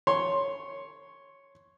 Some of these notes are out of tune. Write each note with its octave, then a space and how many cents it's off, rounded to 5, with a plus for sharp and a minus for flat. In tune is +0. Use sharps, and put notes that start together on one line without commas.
C#5 +0 C6 +10